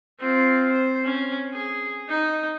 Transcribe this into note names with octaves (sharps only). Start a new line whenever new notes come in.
C4 F4
C5
C#4
G#4
D#4